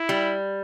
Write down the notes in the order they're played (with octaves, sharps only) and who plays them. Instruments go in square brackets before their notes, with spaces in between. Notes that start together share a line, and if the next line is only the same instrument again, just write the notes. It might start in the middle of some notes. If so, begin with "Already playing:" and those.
Already playing: [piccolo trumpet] E4
[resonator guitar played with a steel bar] G3